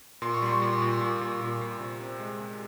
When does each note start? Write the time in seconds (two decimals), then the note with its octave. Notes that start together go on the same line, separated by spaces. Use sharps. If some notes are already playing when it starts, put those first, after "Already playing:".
0.22 A#2 C6
0.34 C#6
0.42 G3 C6
0.62 A#2
0.82 A#2
1.01 A#2
1.21 A#2
1.41 A#2
1.61 A#2
1.80 C3
2.00 C4
2.20 G#3
2.40 C3